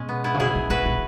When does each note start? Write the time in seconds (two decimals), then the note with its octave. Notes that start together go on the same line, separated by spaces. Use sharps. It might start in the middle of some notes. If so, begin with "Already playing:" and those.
Already playing: B2 G#3 C#4
0.09 B3
0.24 B3 E4
0.34 C#3
0.40 B2 E4 G#4
0.55 B2
0.70 B2 F#4 B4
0.86 B2